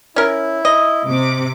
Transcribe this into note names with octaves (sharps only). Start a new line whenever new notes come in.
C#4 E4 A#4
D#5
C3 D6